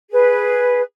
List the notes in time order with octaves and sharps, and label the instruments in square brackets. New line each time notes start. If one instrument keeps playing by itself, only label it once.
[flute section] G#4 B4